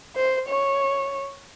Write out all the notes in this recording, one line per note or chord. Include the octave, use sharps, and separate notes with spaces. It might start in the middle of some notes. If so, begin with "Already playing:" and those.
C5
C#5